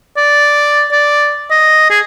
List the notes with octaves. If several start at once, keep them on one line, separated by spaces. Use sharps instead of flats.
D5
D5
D#5
G#4